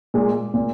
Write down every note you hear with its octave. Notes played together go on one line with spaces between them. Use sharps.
A#2 G#3
A#2